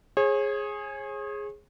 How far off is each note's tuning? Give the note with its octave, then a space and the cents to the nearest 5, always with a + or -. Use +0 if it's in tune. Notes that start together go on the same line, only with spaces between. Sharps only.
G#4 +0 C#5 -40